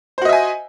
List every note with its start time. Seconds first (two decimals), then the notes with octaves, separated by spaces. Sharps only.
0.18 C5
0.22 F#4
0.25 D#5
0.29 E5
0.33 G#5